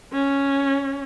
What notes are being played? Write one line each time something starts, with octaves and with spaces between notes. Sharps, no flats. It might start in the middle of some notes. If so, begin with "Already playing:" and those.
C#4